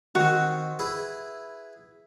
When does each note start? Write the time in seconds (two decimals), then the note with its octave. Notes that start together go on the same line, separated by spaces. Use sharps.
0.15 D#3 C4 F#4
0.79 E4 G#4 B4